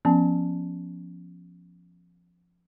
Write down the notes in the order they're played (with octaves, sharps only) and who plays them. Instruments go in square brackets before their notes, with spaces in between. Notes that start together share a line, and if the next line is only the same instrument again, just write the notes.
[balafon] F3 B3 C#4 A5